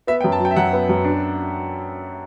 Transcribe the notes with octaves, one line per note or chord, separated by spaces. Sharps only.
B3 E5
G5
F#2
A5
F#3 G5
E5
F#2 F#5
B3
F#2
D4